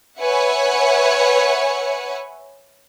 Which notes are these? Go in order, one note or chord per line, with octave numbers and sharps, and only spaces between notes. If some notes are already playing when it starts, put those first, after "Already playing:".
B4 C#5 E5 F#5 G#5